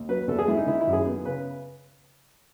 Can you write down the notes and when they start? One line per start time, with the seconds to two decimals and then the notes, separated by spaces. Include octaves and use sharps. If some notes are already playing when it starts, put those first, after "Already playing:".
Already playing: D#2
0.09 F#3 B4
0.28 E2 A4
0.38 G#4
0.48 G#3 E4
0.57 D#4
0.67 D#3 E4
0.80 E4
0.87 F#2
0.93 G#4
1.06 B3
1.25 C#3 B4